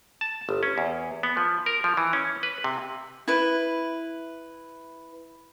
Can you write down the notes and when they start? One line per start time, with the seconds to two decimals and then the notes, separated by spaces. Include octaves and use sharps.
0.21 A5
0.49 G1
0.63 C#4
0.78 E2
1.23 B3
1.37 F3
1.66 A#4
1.84 F3
1.97 E3
2.13 C#4
2.43 B4
2.64 C3
3.28 E4 B4